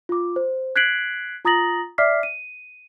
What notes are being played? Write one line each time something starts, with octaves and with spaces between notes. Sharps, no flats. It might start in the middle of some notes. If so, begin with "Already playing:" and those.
F4 D6
C5
F#6 G#6 B6 C7 D7 F#7
F4 A#5 D#6 A6 A#6 F#7
D5 E5 D6 F6 B6 C7
D#7